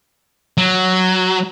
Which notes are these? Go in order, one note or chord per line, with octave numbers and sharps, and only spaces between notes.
F#3